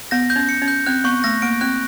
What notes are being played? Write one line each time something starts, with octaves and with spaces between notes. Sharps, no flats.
B3 A#6
G6
C#4
C#7
C#4
G6
C4 F#6
B3 C#6
A3 A#6
A#3 D7
C4 F#6